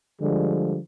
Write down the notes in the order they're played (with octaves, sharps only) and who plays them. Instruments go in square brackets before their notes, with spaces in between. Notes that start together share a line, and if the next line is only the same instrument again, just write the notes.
[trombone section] D3 F3 G3 G#3